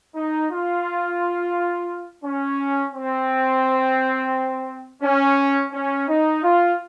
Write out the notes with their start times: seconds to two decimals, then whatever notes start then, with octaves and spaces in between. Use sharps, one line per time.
0.15 D#4
0.51 F4
2.24 C#4
2.95 C4
5.03 C#4
5.73 C#4
6.08 D#4
6.43 F4